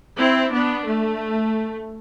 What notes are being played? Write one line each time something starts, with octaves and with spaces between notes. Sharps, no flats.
C4 E4
B3 D4
A3